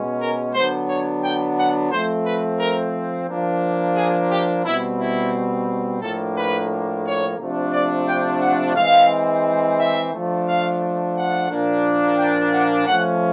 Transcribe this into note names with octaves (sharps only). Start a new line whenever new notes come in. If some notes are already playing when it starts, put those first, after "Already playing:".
Already playing: B2 G#3 C#4
A#4
D3 F#3 B3 D4 C5
C#5
G5
F#5
F3 A3 C4 C5
B4
A#4
F3 A#3 D4
G#4
G4
B2 G3 C4 E4
E4
A2 F3 A#3 D4 A4
B4
C#5
C3 F3 A3 D4
D5
G5
F#5
E3 G#3 C4 F5
E5
F3 A3 D4
F5
F#5
A#2 F3 A#3 D4
G5
F#5
F3 A3 C#4 F#5